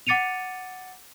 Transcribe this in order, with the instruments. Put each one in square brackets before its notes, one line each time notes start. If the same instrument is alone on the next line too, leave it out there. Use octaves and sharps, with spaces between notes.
[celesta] F#5 D6 A6 C#7 D#7 F7